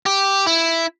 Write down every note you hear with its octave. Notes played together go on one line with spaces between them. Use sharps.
G4
E4